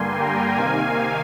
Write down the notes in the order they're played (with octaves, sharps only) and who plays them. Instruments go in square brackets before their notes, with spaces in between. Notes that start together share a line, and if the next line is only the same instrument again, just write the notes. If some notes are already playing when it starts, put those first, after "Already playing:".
Already playing: [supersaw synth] G2 D3 G3 A#3 G#5 C6
G5 A#5
C3 D#3 A#3 F5 G#5